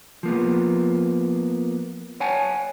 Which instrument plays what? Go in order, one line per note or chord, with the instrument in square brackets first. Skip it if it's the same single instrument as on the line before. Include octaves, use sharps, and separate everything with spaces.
[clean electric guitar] F3 A#3 B3
C#5 F#5 G#5 A5